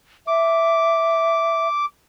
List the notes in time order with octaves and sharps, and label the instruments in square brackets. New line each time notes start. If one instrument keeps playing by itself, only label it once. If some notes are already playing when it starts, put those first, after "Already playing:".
[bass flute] E5 [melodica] D6